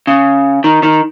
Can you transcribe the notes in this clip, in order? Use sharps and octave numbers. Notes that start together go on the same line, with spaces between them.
C#3
D#3
D#3